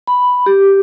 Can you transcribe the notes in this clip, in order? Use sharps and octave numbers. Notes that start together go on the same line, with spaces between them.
B5
G4